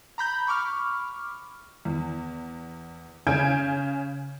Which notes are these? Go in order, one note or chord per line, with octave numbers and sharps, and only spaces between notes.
A#5 B5 G6
B5 C#6 D6 F6
E2
C#3 G#5 G6 G#6 D7